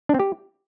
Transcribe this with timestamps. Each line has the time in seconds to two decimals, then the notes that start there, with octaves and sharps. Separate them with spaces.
0.09 D4
0.14 C4
0.20 G4